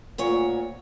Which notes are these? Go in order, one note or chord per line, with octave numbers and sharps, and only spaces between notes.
D2 A#2 C#5